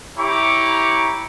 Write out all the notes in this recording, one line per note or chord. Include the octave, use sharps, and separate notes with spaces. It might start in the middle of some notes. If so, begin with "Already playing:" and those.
E4 G4 C#5 A#5 D6